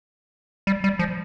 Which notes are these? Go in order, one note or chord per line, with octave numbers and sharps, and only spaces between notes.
G3
G3
F3